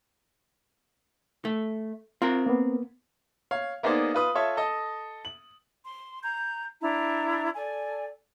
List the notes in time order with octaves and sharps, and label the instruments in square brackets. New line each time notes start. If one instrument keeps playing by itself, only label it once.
[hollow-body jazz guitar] A3
[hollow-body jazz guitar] C4 A#4 [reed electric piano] F4
[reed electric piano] A#3 B3
[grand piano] C#5 F5
A#3 B3 D#4 G#4 C5 D5
F4 B4 D#6
F4 A4 C#5 E5
A4 D#5
F#7
[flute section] C6
A#5 G6
D4 E4 A#5
A4 D5 G#5